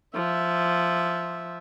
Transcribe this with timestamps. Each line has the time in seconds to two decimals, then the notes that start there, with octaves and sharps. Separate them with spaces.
0.15 F3 E5